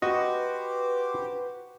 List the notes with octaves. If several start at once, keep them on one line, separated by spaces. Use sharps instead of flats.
F#4 G4 B4 C5 D#5 D6